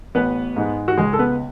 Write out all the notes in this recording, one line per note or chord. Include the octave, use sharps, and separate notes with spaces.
A1 B3 B4
G#2 G#3
F#4
C#2 G#3 G#4
A4
B3 B4